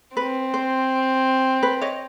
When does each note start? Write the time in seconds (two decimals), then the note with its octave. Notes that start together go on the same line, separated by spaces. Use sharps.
0.16 C4 B4
0.54 C5
1.63 B4
1.81 C#5 D#5